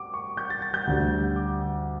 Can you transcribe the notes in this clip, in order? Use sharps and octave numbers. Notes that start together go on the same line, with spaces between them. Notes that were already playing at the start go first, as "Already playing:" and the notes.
Already playing: D6
C#6
G6
A6
A6
G6
D2 D3 G3
D6